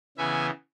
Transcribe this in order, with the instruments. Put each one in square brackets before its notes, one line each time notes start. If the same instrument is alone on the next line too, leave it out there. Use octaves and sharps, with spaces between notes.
[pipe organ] C#3 E3 B3 E5 G#5